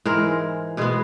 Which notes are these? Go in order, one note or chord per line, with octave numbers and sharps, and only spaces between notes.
G#2 E3 G#3 A#4
B2 G#3 B3 G#4